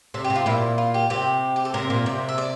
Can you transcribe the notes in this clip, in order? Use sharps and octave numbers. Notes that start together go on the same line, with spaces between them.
C3 A4
G4
C3
F4
A#2 E4
F4
G4
C3 G4
G4
A4
C3 A#4
A#2
C3
E5
D5